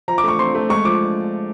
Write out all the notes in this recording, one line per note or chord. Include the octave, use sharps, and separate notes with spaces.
F3 A#5
D6
A3 C#6
C4 C6
A3
G#3 C#6
F3 D6